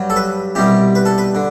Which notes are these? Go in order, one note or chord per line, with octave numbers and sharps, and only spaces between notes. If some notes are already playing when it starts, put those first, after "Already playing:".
Already playing: G2 F#3
A4
B4
C2 B2 G3 G4
B4
A4
B4
D3